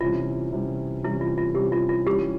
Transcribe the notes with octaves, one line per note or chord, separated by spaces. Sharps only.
C3 E3 G3 C#4 F4
C3 E3 G3 C#4
C3 E3 G3 C#4 E4
F4
F4
C3 E3 G3 C#4 G4
F4
F4
E3 G3 C#4 G4